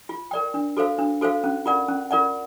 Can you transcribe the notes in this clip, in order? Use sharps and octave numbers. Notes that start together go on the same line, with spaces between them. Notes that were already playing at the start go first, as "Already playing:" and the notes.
F4
A#4 D5 G5
D4
F#4 A4 C5 F5
D4
F#4 A4 C5 F5
C#4
F4 A#4 D5 F#5
C#4
F4 A#4 D5 F#5